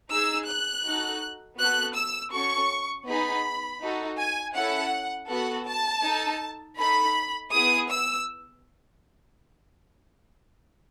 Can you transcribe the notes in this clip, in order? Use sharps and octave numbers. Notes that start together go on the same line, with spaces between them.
D#4 G#4 E6
F#6
D#4 F#4 A4
B3 F#4 A4 F#6
E6
C#4 F#4 A4 C#6
B3 D#4 G#4 B5
D#4 F#4 A4
G#5
C#4 E4 A4 F#5
B3 F#4 A4 F#5
A5
D#4 A4
D#4 A4 B5
B3 E4 G#4 D#6
E6